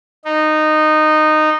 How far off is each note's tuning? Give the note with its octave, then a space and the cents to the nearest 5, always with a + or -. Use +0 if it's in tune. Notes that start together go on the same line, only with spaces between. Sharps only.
D#4 -15